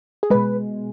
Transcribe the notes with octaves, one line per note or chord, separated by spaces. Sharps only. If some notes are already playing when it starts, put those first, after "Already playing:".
G#4
B2 G#3 B4